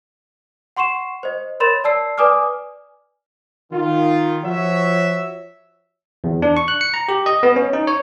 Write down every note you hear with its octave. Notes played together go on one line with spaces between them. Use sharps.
F#5 C6 C#6 C7 E7
C5 D#5
A#4 C#5 B5 C6 A6 E7
D5 A5 E6 C7
B4 D5 G#5 D6 D#6 F6
D#3 F4
F3 F#4 C#5 E5
E2
D4
C#6
F#6
C#7
A#5
G4
D#5
B3
C#4
D#4
C#5